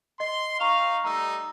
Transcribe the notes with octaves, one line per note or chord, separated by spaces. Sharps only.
D#5 C6
D#4 F5 A#5 C#6 F7
G3 A3 D#4 A#5 E6